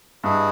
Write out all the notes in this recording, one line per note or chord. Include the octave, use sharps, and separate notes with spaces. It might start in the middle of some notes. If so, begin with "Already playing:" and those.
G2 E4 G#4 B4 D#5